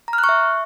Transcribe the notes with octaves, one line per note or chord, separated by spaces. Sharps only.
A#5
F6
F#6
C#6
E5